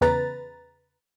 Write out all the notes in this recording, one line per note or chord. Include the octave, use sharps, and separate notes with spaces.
E2 C#3 B4 A#5 A6